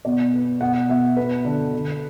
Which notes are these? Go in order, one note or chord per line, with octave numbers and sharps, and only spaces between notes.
B2 D5
B3
B2 F#5
B2 E5
B3 B4
D3
D3